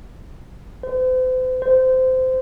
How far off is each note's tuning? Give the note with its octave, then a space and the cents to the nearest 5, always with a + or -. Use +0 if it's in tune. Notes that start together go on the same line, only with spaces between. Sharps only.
C5 -40
C5 -20